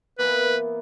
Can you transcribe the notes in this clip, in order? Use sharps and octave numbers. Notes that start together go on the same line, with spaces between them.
E3 A#3 B3 B4